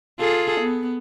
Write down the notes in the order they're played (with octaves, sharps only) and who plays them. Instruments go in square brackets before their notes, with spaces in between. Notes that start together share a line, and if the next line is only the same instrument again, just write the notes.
[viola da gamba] F4 G#4 A4
B3